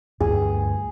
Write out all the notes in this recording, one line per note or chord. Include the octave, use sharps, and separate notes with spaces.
D2 G2 G#4